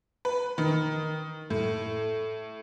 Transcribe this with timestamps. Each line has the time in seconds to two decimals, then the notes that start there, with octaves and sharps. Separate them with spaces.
0.25 B4
0.58 D#3
1.50 A2